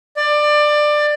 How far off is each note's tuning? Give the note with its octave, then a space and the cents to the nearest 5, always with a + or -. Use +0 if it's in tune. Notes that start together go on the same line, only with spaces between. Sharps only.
D5 +20